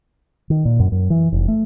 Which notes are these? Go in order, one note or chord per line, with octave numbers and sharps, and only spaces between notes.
D#3
A#2
F#2
F#2
E3
F1
A3